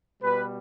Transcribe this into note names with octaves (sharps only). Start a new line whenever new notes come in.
B2 G3 B4